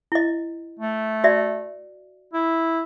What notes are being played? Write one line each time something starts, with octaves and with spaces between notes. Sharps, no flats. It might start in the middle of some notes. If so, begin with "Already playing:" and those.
E4 D#5
A3
F#4 D5 E5
E4